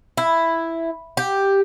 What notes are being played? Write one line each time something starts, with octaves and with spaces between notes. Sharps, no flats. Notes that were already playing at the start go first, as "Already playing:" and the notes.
E4
G4